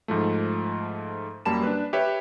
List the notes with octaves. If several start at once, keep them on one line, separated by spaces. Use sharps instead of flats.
G#2 F3 A3
F#2 G3 A#3 A5 B5 E7
D4 B4
G4 B4 C#5 E5